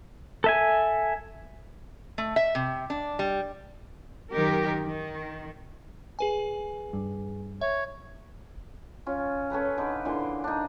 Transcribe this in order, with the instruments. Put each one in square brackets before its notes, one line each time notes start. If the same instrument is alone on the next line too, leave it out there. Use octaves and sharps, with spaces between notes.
[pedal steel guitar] A4 E5 G#5
[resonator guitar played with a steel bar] A3
E5
C3
D4
G3
[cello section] F#2 D#3 G4 A#4
D#3
[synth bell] G#4 B4 G#5
[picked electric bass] G2
[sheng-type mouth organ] C#5 [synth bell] E5
[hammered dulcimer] C#4 F4
C#4 A4 B4 A#5
D3 D#4 B4
A#2 D3 E3 C6
D4 D#4